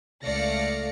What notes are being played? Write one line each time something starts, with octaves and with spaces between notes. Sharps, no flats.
C#2 A3 D5 F5 A#6 C#7